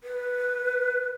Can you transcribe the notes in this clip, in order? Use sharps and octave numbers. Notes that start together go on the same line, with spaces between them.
B4